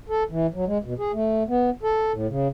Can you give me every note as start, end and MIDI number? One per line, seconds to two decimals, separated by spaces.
0.09 0.23 69
0.31 0.47 52
0.54 0.65 54
0.67 0.78 56
0.84 0.94 47
0.99 1.12 68
1.13 1.43 57
1.48 1.70 59
1.83 2.12 69
2.13 2.27 45
2.28 2.48 49